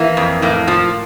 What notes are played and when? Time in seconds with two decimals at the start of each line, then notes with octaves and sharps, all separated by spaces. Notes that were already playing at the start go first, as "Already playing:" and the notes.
Already playing: E3 A#3
0.17 F2
0.42 A2 A#3
0.68 F3